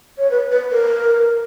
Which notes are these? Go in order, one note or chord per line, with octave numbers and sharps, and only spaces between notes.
C#5
B4
B4
A#4